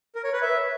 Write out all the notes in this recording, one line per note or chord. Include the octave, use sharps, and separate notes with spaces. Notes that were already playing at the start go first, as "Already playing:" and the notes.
A#4
C#5
B4
E5